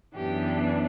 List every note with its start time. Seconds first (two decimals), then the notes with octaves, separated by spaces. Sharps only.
0.16 F#2 E3 B3 D4 G4